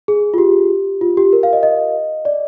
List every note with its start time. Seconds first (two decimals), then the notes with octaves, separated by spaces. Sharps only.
0.08 G#4
0.34 F4
0.38 G4
1.01 F4
1.17 G4
1.33 A#4
1.43 F5
1.53 D#5
1.63 D#5
2.25 D5